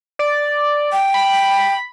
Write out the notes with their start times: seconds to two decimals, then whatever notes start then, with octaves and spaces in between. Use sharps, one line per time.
0.19 D5
0.92 G5
1.14 B5